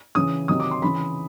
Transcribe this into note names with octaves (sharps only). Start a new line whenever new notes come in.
C#3 E3 D#6
C3 D#3 F#3 D#6
D6
C6
C#3 E3 B5